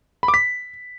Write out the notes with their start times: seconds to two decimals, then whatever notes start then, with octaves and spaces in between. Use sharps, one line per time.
0.23 B5
0.28 D6
0.34 B6